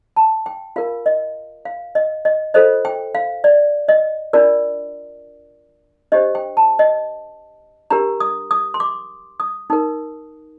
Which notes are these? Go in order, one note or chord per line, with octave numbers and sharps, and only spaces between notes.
A5
G5
F4 A#4 F5
D#5
F5
D#5
D#5
F4 A4 C5 D#5
G5
F5
D5
D#5
D4 F4 A#4 D5
D4 G4 C5 D#5
G5
A5
D#5
D4 G4 A#4 A#5
D#6
D#6
C6
D6
D#6
D#4 A#4 D#6